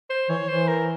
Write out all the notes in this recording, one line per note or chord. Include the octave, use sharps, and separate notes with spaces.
C5
E3 C#5
E3 C5
A#4